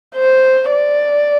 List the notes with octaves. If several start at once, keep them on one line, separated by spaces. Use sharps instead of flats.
C5
D5